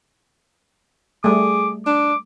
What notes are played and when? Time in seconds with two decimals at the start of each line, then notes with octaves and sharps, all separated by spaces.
1.24 G3 A3 G#4 D6
1.86 D4 D6